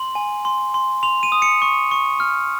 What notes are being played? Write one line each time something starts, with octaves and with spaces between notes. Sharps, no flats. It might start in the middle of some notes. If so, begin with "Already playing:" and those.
Already playing: C6 F#7
G#5
C6
C6
C6 F7
D#7
D#6
C#7
C#6
C#6
F6